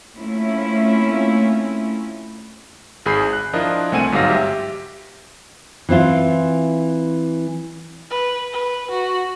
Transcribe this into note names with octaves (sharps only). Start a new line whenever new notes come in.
A3 A#3 C4 C#4 E4 F4
G#1 G#4 B5 G6 C7
F#6
F3 D4 E4 F4 A#4 D#5
C2 A3 C4 F#5 G#5 D#7
G1 G#2 F#3 F5 A#6
G4 E5
E3 C4 E4 F4
B4
B4
F#4